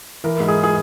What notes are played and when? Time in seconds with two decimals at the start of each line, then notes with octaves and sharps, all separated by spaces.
0.24 E3 A#4
0.40 G#2
0.48 G#4
0.63 G#4